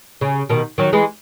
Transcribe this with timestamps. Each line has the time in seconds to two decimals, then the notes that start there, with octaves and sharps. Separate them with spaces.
0.21 C#3
0.49 B2 D#3
0.78 D#3 F#3
0.93 E3 G#3